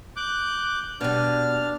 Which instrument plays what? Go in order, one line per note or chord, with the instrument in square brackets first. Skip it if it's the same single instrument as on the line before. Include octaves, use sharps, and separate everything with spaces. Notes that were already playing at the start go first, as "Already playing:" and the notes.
[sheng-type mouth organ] D6 F#6 G6
[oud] B2 G3 [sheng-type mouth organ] D4 F6